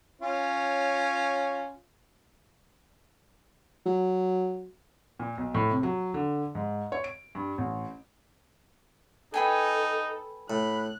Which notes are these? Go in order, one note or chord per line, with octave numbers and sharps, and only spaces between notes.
C#4 F4 C#5
F#3
A#2
B1
A2
C3
F#3
D3
G#2
C#5
D7
G2
A1
D#4 A4 B4 G5 G#5
A2 B5 F#6